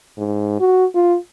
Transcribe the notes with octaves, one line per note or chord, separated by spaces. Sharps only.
G#2
F#4
F4